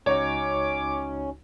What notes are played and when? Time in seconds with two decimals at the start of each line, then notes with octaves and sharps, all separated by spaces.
0.06 C#2 C#4 D#4 F#4 C#5 D6